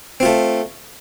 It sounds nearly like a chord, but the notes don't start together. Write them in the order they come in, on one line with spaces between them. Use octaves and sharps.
C4 F4 A3